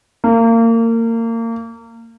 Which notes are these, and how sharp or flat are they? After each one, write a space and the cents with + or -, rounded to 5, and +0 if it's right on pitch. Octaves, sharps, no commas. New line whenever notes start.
A#3 -30